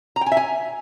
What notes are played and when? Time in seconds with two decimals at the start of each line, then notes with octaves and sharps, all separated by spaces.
0.16 A#5
0.21 G5
0.26 G#5
0.32 E5
0.37 G#5